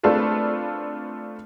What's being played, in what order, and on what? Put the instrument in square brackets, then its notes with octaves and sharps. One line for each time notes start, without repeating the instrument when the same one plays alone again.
[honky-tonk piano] A3 C4 D4 F4 A4 B4